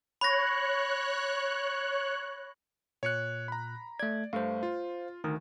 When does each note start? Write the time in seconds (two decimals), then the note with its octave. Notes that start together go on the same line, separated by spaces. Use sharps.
0.21 C#5 B5 F#6 A#6
3.03 A#2 C#5 F#6 C#7
3.48 A#5 B5
3.99 A3 D5 G#6
4.33 G2 A3 C5 F5
4.63 F4
5.24 D2 D#3